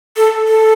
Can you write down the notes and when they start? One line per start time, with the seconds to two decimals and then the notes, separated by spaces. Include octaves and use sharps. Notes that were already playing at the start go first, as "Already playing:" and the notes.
0.17 A4
0.47 A4